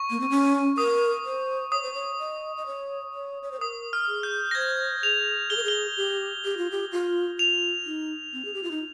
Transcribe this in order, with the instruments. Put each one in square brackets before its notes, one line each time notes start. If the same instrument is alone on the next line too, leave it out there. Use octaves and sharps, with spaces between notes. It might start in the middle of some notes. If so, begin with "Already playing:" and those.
Already playing: [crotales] C#6
[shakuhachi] A#3
C4
C#4
[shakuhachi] A#4 [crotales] D#6
[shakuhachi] C5
[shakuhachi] C#5 [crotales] D#6
[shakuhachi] C5
C#5
D#5
D#5
C#5
C#5
C#5
C5
[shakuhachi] A#4 [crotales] D#6
[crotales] F6
[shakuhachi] G#4
[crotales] G6
A#6
[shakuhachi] C5 [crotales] G#6
[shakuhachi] G#4 [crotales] F7
[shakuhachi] G#4 [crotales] G7
[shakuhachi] A#4
[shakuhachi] G#4 [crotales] G7
[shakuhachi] G4
G4
F4
G4
F4
[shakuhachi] F4 [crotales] F7
[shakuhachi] D#4
C4
G#4
G4
F4
D#4